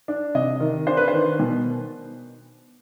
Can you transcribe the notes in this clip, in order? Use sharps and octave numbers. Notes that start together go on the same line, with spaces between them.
D4
C3 D#5
D#3
D4 C5
B4
C5
D#3
B2